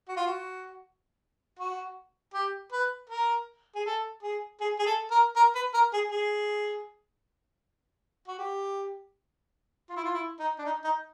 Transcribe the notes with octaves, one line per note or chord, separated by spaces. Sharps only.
F#4
F4
F#4
F#4
G4
B4
A#4
G#4
A4
G#4
G#4
G#4
A4
A#4
A#4
B4
A#4
G#4
G#4
F#4
G4
F4
E4
F4
E4
D#4
D4
D#4
D#4